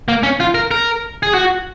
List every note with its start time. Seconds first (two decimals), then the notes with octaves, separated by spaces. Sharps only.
0.08 A#3
0.23 C#4
0.40 F4
0.55 A#4
0.71 A#4
1.23 G#4
1.34 F#4